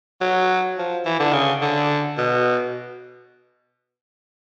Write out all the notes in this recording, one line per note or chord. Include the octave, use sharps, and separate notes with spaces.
F#3
F3
E3
D3
C#3
D3
B2